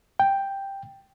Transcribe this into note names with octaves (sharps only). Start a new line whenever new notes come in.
G5